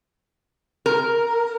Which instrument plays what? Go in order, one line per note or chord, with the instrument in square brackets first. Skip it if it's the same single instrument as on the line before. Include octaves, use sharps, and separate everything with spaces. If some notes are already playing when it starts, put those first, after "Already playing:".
[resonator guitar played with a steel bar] A#4